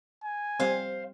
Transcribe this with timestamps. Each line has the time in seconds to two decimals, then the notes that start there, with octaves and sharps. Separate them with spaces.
0.24 G#5
0.60 G3 C4 C5 F5